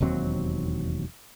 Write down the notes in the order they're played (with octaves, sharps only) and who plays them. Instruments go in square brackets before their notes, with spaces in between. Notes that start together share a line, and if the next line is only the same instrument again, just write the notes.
[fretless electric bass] E1 D#2 F#3 C4